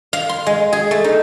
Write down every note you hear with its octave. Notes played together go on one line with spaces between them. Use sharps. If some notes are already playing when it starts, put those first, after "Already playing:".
F5
C6
G#3
G#4
A3
D#4